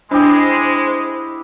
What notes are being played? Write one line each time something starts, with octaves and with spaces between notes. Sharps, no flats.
G#3 D4 E4 G4 G#4 C5